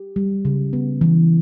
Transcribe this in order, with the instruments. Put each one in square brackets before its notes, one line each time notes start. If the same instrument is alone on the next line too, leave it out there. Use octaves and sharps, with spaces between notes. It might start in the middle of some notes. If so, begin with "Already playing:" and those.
Already playing: [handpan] G4
G3
C#3
B3
E3